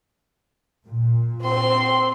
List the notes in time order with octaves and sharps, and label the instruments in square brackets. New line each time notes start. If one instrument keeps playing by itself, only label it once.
[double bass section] A#2
[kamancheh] C4 C6